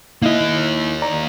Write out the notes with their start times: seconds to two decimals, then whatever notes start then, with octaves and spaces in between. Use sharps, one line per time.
0.22 A#3 D#4 E4 D#5
1.02 D5 A#5